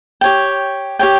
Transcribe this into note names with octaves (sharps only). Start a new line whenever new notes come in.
G4 C#5 G5
G4 C#5 G5